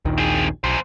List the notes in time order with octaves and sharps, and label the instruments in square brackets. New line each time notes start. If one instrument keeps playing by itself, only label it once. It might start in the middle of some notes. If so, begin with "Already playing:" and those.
[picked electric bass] A#1 D#2 D#3
[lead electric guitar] C4 G#4
[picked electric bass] B1 [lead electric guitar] E2 C5